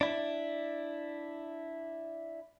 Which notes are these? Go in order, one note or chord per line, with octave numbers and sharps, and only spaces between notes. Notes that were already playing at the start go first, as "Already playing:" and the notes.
D4 E4